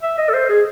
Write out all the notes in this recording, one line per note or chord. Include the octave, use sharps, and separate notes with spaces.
E5
D#5
A4
C5
G#4